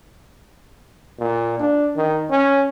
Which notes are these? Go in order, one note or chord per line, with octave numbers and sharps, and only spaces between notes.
A#2
D4
D#3
C#4